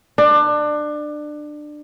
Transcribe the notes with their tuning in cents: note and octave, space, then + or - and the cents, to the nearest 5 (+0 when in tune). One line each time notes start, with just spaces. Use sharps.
D4 +25